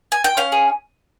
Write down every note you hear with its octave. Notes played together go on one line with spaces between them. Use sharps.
G#5
G5
C#4 F5
G#4